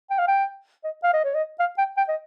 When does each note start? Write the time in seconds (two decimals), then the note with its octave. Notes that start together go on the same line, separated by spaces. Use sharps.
0.10 G5
0.19 F5
0.28 G5
0.84 D#5
1.03 F5
1.13 D#5
1.24 C#5
1.35 D#5
1.60 F5
1.78 G5
1.97 G5
2.08 D#5